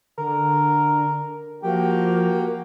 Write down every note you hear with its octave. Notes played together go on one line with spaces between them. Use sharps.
D3 A#4
F3 A#3 F#4 G4 A#4 G5